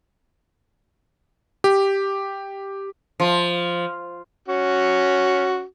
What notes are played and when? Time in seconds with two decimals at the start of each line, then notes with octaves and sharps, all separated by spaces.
1.64 G4
3.20 F3
4.48 C#4 F#4